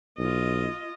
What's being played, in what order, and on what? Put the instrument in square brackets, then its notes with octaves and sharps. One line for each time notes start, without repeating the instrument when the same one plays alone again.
[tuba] B1 [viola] F4 D#5